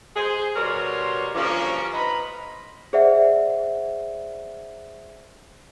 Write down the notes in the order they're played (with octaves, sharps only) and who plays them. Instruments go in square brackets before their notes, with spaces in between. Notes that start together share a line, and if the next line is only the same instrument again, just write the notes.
[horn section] G#4 C5
B2 G3 A#4 C#5 C6
G2 D3 F3 A#3 C#4
B4 C5 D#5 A#5 B5
[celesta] G#4 C5 D5 E5 F#5